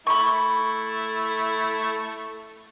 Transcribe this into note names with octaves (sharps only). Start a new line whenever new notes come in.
A3 E4 B5 C#6